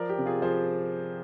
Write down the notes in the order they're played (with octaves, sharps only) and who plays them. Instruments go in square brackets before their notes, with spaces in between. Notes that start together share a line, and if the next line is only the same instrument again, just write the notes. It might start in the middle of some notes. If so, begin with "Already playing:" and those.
Already playing: [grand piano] F3 A#4 D5
G4
C3
F4 G#4
F3 G#4 C5